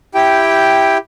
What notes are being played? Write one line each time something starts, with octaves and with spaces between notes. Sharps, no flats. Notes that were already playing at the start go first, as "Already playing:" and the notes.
E4 G4 G5